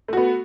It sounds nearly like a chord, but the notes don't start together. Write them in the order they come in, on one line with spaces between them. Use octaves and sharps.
A3 F#4 B3